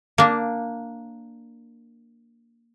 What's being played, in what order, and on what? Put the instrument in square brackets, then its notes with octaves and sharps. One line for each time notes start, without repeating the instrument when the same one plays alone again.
[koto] A#3 D4